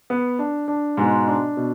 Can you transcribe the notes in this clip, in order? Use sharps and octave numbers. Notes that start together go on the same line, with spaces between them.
B3
D4
D4
G#2 B2 G#3
D4
B2